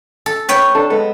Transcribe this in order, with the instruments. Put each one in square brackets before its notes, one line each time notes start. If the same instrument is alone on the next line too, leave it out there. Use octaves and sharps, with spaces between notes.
[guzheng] A4
B4 C#5 G5
[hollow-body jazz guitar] D4 A4
G#3 B3 A4